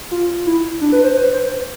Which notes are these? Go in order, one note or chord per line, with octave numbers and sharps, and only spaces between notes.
F4
E4
D4
B4
C5
B4
C5